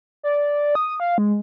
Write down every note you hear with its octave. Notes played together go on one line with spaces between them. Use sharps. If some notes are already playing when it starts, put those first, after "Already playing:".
D5
D#6
F5
G#3